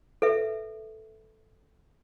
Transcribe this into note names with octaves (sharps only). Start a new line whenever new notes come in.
A4 B4 E5